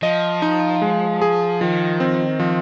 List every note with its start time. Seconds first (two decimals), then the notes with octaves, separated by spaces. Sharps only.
0.03 F3 D#5
0.42 D#4
0.82 G#3
1.22 G#4
1.61 D#3 F3
2.00 C4
2.40 F3